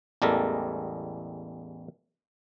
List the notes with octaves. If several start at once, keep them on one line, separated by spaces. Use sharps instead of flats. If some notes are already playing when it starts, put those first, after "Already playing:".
A1 E2 G3 G#3 A4 A#4